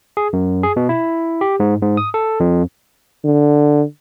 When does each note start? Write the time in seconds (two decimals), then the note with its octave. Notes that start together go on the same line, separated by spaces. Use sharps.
0.17 G#4
0.33 F#2
0.63 G#4
0.76 B2
0.89 E4
1.41 G4
1.60 G#2
1.82 G#2
1.97 D#6
2.14 A4
2.40 F2
3.25 D3